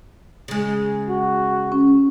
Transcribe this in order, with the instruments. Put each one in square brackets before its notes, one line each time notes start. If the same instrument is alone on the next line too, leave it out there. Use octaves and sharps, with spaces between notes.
[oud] C#3 G#3
[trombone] F#4
[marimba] C#4